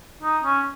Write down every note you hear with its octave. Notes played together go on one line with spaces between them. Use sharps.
D#4
C#4